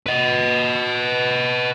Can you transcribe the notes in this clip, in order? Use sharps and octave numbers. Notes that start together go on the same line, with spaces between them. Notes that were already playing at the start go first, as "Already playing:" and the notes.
B4 D#5